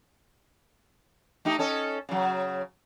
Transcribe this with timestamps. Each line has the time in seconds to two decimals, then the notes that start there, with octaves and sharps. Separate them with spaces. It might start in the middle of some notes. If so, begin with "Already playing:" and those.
1.45 A3 D#4 G4
1.59 C#4 A4 D#5
2.09 C#3 F#3